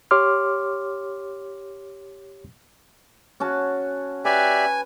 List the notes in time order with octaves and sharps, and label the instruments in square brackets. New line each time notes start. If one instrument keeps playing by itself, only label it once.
[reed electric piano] G4 C#5 C6 D6 F6
[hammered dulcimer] C#4 F#4 A5
[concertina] G4 D5 E5 [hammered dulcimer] B4 [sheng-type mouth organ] G#5